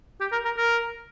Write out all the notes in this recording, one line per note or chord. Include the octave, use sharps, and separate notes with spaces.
G4
A#4
A#4
A#4